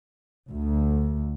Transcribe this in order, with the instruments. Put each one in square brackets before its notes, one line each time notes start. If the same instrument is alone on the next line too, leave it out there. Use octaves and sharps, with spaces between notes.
[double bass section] D2